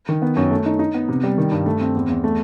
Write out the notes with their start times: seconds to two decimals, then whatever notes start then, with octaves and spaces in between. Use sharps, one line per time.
0.09 D#3
0.22 B3
0.36 F#2
0.51 A3
0.66 D#4
0.79 D#4
0.95 B3
1.09 C3
1.24 G3
1.38 D#3
1.52 G2
1.66 A3
1.81 C4
1.95 E2
2.10 E2
2.24 A3